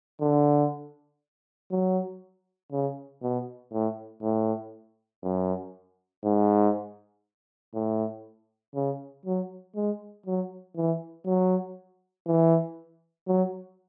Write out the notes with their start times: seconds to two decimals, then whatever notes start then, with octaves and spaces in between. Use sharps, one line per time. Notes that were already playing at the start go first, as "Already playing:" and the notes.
0.21 D3
1.71 F#3
2.72 C#3
3.23 B2
3.72 A2
4.23 A2
5.23 F#2
6.24 G#2
7.75 A2
8.75 C#3
9.26 F#3
9.76 G#3
10.26 F#3
10.76 E3
11.26 F#3
12.27 E3
13.28 F#3